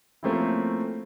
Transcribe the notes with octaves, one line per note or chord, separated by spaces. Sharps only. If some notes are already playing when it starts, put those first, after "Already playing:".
F3 A3 A#3 C4 C#4 E4